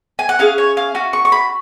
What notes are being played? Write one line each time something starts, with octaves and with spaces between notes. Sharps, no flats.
G#5
F#5
C#4 G#4 F5
C#5
F5
C#4 F#4
C#6
C#6
B5